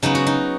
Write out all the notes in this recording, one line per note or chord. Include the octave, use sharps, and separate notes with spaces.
C#3 F#3 B3 D#4
F#4
D#4